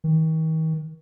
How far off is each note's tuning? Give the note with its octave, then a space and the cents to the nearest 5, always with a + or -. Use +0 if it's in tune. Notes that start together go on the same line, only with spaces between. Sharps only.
D#3 +40